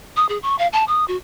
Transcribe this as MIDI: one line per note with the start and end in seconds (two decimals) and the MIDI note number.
0.16 0.26 87
0.29 0.38 68
0.43 0.58 85
0.59 0.67 77
0.73 0.84 81
0.88 1.05 87
1.08 1.17 66